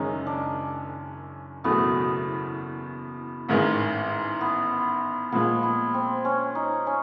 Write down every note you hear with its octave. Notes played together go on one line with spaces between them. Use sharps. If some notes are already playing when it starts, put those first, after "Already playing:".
Already playing: F#1 F#2 D#3 G#3 C#4 D#4
D4
F#1 E2 B2 F#3 A3 B3
A1 G#2 D#3 G#3
B3
A#2 F3 G#3 B3
B3
C4
C#4
D#4
C#4